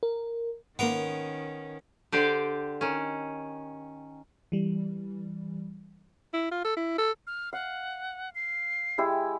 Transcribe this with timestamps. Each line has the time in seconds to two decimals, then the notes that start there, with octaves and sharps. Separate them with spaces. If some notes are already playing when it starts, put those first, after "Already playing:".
0.03 A#4
0.79 G#2 D#3 A#3 B3 C#4 A#4 C6
2.12 D3 G4 C5 D5
2.81 D#3 C#4
4.52 E3 G3
6.34 E4
6.51 F4
6.64 A4
6.77 E4
6.98 A4
7.27 F6
7.53 F5 F#5
8.35 C7
8.98 G#3 E4 G4